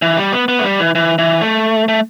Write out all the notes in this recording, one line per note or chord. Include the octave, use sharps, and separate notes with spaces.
E3
G3
B3
B3
A3
G3
E3
E3
E3
A3
A3